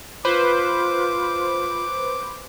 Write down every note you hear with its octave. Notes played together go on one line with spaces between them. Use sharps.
F4 B4 C5 D6